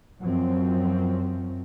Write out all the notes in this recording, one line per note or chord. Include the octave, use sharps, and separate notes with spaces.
F#2 F3 F#3 C4